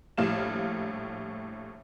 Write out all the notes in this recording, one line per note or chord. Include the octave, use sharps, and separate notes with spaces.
A#1 A2 G3 F5 E7